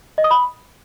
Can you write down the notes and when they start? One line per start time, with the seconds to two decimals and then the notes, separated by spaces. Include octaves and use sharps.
0.18 D#5
0.24 D#6
0.31 B5